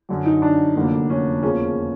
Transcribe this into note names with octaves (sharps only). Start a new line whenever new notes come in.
F#2 D3 F#3
D#4
D4
F1 F2 D3 F#3 A#3
C#4
E2 C#3 F3 A#3 C#4